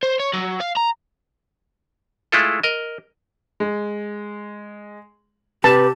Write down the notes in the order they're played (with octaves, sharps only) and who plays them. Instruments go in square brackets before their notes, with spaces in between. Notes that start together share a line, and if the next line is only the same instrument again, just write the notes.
[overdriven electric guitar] C5
C#5
F#3
F5
A#5
[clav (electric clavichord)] G#3 A3 E4 F4 A4
A#4 D#5
[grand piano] G#3
[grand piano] C3 [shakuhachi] G4 [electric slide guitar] B4 [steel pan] A5